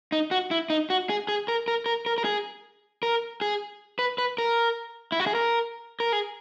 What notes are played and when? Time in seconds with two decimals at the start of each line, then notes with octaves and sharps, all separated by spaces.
0.12 D#4
0.31 F#4
0.51 E4
0.70 D#4
0.90 F#4
1.10 G#4
1.28 G#4
1.48 A#4
1.68 A#4
1.86 A#4
2.06 A#4
2.18 A#4
2.25 G#4
3.03 A#4
3.41 G#4
3.99 B4
4.18 B4
4.38 A#4
5.12 E4
5.20 F#4
5.27 G#4
5.35 A#4
6.00 A#4
6.13 G#4